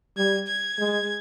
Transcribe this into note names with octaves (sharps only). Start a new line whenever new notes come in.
G3 G#6
G#6
G#3